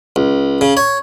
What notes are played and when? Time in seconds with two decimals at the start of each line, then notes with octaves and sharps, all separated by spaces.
0.16 C#2
0.61 C#3
0.77 C#5